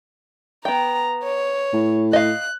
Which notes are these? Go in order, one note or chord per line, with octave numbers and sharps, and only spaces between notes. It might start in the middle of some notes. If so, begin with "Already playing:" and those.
B3 G5 A#5
C#5
A2
D#5 F5 F#6